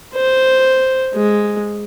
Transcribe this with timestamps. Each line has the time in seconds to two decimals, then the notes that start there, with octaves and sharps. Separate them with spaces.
0.14 C5
1.15 G#3